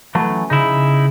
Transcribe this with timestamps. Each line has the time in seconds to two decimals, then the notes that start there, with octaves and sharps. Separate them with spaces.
0.15 E3 F#3 A3
0.29 C#4
0.50 C#3 D#4 E4